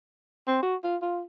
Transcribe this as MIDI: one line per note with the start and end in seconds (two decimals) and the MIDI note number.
0.47 0.59 60
0.62 0.75 66
0.84 0.96 65
1.02 1.23 65